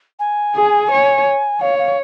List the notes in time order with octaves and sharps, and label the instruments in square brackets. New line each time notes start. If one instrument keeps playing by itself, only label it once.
[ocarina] G#5
[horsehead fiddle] G#4
C#5
[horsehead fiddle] C#5 [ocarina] F5
[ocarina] F5